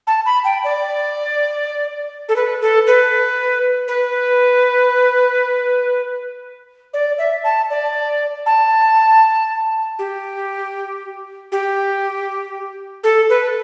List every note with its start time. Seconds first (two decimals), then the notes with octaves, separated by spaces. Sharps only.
0.07 A5
0.25 B5
0.44 G5
0.64 D5
2.28 A4
2.35 B4
2.61 A4
2.86 B4
3.87 B4
6.93 D5
7.18 E5
7.43 A5
7.70 D5
8.45 A5
9.98 G4
11.51 G4
13.03 A4
13.29 B4